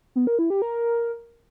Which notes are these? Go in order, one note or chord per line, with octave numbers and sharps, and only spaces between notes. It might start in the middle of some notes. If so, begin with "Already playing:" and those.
B3
A#4
E4
G4
A#4